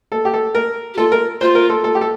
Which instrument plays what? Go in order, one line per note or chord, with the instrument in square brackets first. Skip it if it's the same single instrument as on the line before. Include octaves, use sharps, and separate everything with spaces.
[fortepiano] A4
G4
A4
A#4
[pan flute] G4
[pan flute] F4 [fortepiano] A4
[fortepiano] A#4
[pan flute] F4 [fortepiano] C5
[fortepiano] A#4
A4
A4
G4
A4